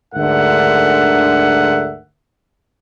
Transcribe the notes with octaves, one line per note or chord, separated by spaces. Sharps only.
D2 G#2 D3 A#4 E5 F#5